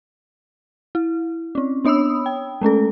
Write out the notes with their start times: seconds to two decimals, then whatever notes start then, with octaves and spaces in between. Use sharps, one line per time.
0.95 E4
1.55 C4 C#4
1.85 B3 D4 C#5 B5 D#6 E6
2.26 G5
2.61 G#3 A3 C#4 A4